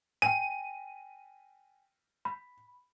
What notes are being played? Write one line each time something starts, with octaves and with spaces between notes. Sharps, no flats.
G5 G#5 D#7
B5